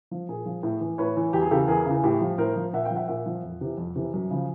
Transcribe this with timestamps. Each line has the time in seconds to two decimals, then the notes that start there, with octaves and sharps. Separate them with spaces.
0.11 F3
0.29 A#2 G#4
0.46 F3
0.63 A2
0.81 E3
0.98 A2 B4 C#5
1.16 E3
1.33 E2 G4
1.42 G#4
1.51 C#3 E3 G4 A4
1.68 E2 G#4 A#4
1.86 C#3 E3
2.04 A2 G4
2.21 F3
2.38 A2 A#4 C5
2.56 F3
2.73 A#2 E5 F#5
2.85 F5 G5
2.91 F3
2.96 E5 F#5
3.08 A#2 E5 F#5
3.26 F3
3.44 F2
3.61 C3 E3
3.78 F2
3.96 C3 E3
4.14 F#2
4.30 C#3 F3